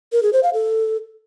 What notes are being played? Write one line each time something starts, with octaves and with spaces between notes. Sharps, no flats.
A#4
G#4
C5
F5
A4